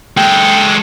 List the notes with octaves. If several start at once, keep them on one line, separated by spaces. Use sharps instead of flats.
G#3 A4 G5